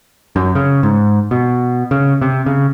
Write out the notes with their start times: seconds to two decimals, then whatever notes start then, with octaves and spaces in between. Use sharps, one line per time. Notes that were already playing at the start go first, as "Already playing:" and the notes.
0.36 F#2
0.55 C#3
0.83 G#2
1.31 B2
1.91 C#3
2.22 C3
2.46 C#3